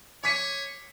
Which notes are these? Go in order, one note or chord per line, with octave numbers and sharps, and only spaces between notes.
C#5 D6 B6 D#7